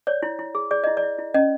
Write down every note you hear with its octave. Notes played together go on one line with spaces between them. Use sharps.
C#5 D5
E4
E4
G#4
G#4 D5
E4 D#5
D5
E4
E4
C#4 D#5